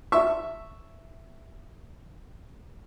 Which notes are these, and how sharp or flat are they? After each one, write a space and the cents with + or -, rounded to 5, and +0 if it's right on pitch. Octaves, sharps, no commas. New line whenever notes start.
E5 +0 A5 +15 C#6 +0